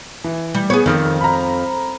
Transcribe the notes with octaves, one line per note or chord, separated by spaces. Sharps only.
E3
G3
B3 G#4 C#5
F2 D#3 F6
A#5 B5